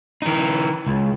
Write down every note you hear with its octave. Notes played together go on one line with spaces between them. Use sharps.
E3 D#4
C#2